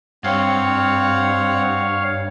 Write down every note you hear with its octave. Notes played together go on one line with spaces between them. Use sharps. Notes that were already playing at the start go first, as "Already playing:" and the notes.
G2 C4 C#5 F5 F#5